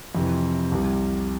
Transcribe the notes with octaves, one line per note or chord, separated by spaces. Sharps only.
F2 C3 E3
C2 C3 G3